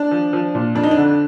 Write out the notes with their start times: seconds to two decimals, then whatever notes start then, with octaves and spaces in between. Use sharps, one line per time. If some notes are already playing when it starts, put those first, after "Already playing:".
Already playing: D4
0.11 F3
0.33 F3
0.55 A#2
0.75 F2 D4
0.83 D#4
0.91 D4
0.97 D3